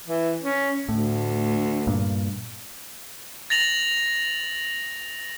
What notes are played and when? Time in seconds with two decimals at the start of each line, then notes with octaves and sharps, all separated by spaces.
0.08 E3
0.43 C#4
0.89 D2 A2
1.87 G2 A#2
3.50 A6 A#6 F7 F#7